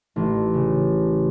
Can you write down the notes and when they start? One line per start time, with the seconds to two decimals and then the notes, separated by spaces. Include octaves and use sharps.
0.16 A1
0.54 C#3